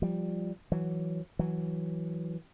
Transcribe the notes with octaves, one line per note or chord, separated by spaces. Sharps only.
F3 G3
E3 F#3
E3 F#3